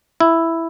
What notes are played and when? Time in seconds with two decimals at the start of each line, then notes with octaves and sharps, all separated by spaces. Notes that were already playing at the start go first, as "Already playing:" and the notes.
0.20 E4